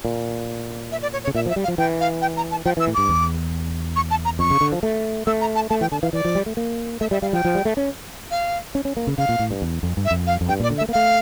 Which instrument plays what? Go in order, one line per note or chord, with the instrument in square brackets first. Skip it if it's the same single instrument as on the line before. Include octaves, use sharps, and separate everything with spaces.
[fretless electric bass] A#2
[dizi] E5
D5
C#5
C#5
[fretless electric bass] C#3
[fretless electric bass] A#2 [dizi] E5
[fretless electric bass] F3 [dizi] E5
[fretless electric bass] G3
[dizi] F5
[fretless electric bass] F3
[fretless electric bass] E3 [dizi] G5
[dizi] F5
G5
A#5
A5
[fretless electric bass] F3 [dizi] G5
[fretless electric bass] E3 [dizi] E6
[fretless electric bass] A2
[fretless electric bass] G2 [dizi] D6
[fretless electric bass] E2
[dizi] C#6
A5
A#5
[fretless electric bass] F2 [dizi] C#6
[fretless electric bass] C#3
D3
F3
A3
[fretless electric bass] A3 [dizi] E6
[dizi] A#5
A5
[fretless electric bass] A3 [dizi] A5
[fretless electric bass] E3 [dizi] G5
[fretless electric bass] D3 [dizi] A5
[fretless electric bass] E3 [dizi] F5
[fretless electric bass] E3 [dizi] D5
[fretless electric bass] F3
G3
A3
A#3
[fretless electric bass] A3 [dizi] E5
[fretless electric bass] G3 [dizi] E5
[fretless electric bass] G3 [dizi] F5
[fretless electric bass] F3 [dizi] G5
[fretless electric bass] F3
G3
A3
C#4
[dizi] F5
[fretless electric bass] C#4
C#4
A#3
C#3
[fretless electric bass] C#3 [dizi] F5
[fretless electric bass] A#2
A2
G2
E2
F2
G2
[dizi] E5
[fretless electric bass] F2
[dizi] F5
[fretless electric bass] F2
[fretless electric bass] G2 [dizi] G5
[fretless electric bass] A#2 [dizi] D5
[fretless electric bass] D3
[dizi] E5
[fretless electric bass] A3
A#3
[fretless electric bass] A3 [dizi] F5